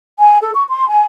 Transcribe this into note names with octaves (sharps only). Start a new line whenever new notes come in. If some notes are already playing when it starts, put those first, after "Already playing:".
G#5
A4
C#6
C6
G#5